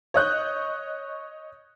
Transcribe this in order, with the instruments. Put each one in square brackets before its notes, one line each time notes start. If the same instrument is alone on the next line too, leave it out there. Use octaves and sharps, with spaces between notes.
[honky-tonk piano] C#5 D#5 F#6 G6